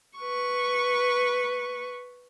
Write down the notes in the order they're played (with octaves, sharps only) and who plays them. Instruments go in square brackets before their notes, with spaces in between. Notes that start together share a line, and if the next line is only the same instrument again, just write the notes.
[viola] B4 C#6